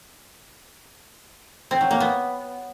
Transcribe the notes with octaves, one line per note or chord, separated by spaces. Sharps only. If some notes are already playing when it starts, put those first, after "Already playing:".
C4
F#3
A#3
B3